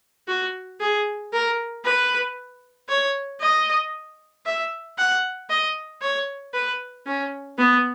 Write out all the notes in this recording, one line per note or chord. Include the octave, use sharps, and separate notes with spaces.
F#4
G#4
A#4
B4
C#5
D#5
E5
F#5
D#5
C#5
B4
C#4
B3